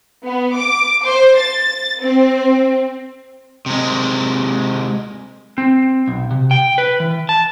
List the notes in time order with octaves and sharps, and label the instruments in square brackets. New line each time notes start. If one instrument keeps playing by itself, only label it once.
[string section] B3
D6
C5
A6
C4
[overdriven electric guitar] C3 G#3
[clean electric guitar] C4
B1
C3
G5
B4
E3
A5